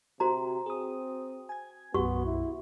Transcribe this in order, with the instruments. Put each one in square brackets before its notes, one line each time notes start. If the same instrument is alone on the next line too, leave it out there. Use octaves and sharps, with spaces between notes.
[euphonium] C3 [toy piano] F#4 C5 A#5
[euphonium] C4 [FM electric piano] G#4 D#6
[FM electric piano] G#5 G#6
[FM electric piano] B1 F#2 [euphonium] B3 [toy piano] F#4 G4 C#6
[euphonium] E4